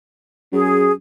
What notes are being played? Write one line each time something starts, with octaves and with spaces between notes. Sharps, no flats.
F#2 G#4